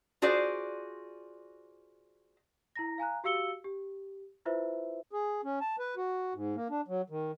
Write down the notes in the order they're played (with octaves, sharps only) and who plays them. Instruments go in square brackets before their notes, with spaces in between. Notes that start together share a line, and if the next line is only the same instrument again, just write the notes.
[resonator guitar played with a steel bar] F4 F#4 G#4 C5 D5
[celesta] E4 A#5 A#6
F5 G#5 A#5 F#6
F#4 G4 F5 E6 C#7 G7
G4
E4 F4 B4 C5 E5
[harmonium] G#4
C#4
A5
B4
F#4
G#2
A#3
D4
F#3
D#3